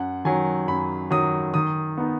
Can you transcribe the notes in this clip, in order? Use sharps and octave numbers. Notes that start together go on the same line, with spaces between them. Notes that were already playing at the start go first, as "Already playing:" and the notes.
Already playing: F#2 F#5
D#3 F#3 G#5
F#2 B5
D#3 F#3 D#6
D#3 D#6
B3 D#4